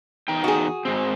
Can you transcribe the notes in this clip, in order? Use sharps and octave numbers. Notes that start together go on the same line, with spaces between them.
E2 D#4 G5
F#4 G#4
G#2 C4